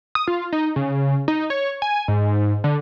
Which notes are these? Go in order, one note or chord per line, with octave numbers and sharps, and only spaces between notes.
D#6
F4
D#4
C#3
D#4
C#5
G#5
G#2
D3